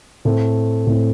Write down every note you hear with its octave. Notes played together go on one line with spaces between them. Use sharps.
A2 A3 C4
A2 A3 C4